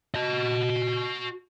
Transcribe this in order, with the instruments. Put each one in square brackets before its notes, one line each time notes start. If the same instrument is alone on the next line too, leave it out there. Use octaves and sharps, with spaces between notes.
[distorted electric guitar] F#4 D#5